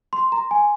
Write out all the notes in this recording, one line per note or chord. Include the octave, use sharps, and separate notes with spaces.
C6
A#5
G#5